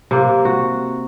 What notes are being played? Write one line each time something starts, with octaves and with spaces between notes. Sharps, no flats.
C3 A#3
F#4